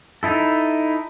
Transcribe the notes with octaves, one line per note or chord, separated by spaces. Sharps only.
D#4 E4 A4